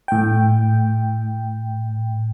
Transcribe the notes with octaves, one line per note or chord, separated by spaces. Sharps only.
A2 G5